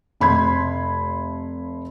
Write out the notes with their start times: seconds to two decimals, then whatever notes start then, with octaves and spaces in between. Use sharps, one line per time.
0.20 F1 B5 C6 G#6